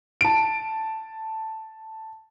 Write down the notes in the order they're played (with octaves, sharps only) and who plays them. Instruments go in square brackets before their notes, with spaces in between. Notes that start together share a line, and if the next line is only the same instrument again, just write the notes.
[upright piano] A5 D7